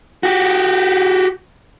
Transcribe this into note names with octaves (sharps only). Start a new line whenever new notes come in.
F#4 G4